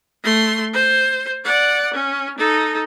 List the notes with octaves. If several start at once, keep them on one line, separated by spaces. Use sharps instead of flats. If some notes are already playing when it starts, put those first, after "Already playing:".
A3 C6
C5
D5 F#5
C#4
D#4 A4